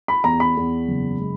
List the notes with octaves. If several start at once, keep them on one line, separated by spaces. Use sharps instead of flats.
B5
E2 A#5
B5
E2
F#1
G#3